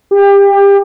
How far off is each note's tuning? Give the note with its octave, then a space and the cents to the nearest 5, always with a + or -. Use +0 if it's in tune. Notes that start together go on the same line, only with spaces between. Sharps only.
G4 +25